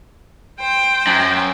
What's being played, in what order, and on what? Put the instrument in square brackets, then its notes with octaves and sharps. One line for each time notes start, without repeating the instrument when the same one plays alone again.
[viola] C5 G5
[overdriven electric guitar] F#2